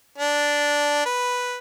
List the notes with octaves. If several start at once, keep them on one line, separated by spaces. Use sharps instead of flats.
D4
B4